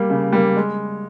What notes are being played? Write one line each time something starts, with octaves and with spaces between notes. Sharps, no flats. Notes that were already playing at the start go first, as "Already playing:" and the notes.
Already playing: G3 A#3
C#3
G3 A#3
G#3